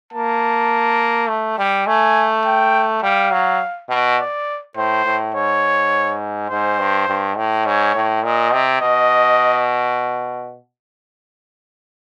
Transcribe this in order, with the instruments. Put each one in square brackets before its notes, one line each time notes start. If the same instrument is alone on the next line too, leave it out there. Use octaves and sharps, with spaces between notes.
[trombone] A#3 [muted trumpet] A5
[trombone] A3
G3
[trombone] A3 [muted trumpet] G#5
[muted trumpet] G5
[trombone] G3 [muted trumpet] F5
[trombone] F#3
B2
[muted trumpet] D5
[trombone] A2 [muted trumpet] C5
[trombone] A2
[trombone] G#2 [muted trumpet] C#5
[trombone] G#2 [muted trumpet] C5
[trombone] G2
G2
A2
[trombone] G#2 [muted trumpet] C#5
[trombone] A2
[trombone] A#2 [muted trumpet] D#5
[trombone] C3
[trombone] B2 [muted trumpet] D#5